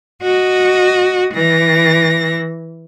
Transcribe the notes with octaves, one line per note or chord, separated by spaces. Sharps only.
F#4 D#5
E3 A#6